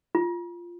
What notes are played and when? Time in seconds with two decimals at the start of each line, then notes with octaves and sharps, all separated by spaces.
0.15 F4